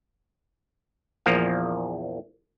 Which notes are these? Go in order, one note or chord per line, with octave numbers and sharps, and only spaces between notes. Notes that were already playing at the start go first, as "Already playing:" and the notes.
A#1 E2 F3 A#3 F5